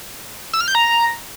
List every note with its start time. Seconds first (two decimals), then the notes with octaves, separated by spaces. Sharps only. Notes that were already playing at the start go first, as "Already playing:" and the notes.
0.53 E6
0.61 F6
0.68 G6
0.75 A#5